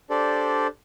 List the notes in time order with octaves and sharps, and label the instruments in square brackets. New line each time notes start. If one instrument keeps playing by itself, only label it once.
[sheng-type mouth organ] D4 G4 A4 C5 D5